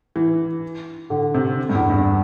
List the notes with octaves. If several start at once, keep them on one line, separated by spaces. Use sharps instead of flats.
E3
D3
C3
G2
E2
G2